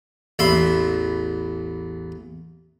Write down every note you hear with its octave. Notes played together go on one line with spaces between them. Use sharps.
A1 E2 E5 B5 C6